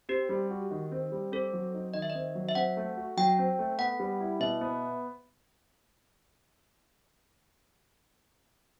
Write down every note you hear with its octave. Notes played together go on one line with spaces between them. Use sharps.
C4 G4
G3
F#4
D#3
C4
G3
C4 A4
F#3
D#4
D#3 D#5
E5
D#5
C4
F#3
E5
C4 F#5
A3
F#4
F#3 G5
C4
A3
B3 F#5
G3
E4
B2 E5
B3